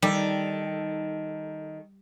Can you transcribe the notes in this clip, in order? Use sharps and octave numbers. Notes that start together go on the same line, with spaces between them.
D#3 G3 A4